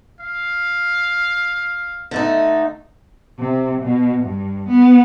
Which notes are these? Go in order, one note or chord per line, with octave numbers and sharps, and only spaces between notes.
F5
D3 A3 D#4
C3
B2
G2
B3